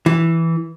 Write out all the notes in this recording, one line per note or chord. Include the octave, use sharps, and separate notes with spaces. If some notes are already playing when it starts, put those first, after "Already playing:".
E3